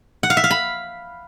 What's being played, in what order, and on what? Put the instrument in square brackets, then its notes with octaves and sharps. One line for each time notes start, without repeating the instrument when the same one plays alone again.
[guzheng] F#5
F5
E5
F5
B5